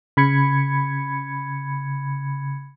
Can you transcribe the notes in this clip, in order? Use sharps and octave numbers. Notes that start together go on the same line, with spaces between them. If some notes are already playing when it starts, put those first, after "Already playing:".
C#3 B5 G#6 C#7